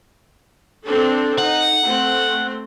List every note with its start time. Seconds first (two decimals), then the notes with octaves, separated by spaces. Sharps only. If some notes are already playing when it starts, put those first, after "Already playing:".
0.85 C4 D4 A4
1.38 D#4 F#5
1.84 A3 C4